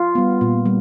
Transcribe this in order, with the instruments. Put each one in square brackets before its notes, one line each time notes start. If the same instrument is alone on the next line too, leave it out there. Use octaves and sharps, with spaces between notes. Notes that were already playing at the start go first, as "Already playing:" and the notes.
Already playing: [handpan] F4
G3 B3
A#2
G3